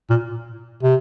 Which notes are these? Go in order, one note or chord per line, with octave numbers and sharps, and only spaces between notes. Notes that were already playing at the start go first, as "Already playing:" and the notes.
A#2
C3